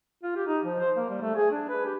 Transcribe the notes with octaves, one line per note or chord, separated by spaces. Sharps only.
F4
G4
D#4
F3
C5
A#3
G3
A3
G#4
D4
B4
G4